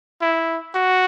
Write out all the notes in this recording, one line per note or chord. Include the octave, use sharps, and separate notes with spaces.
E4
F#4